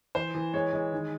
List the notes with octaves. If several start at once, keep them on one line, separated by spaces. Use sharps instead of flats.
E3 C5
E3
G#3 C#5
G#3
D#3